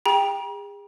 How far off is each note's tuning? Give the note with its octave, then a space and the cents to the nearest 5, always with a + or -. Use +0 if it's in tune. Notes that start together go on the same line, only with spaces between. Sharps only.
G#4 -35 G5 +15 A#5 +45